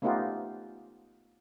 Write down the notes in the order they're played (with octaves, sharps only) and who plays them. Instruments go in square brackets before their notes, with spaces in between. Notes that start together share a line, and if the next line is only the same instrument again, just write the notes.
[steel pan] A3 B3 C#4 D#4 F4 G4